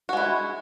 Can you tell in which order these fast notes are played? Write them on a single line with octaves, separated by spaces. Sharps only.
F#4 G#3 E4